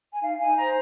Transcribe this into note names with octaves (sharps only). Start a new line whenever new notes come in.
G#5
D#4 F5
D#4 G#5
C5 A#5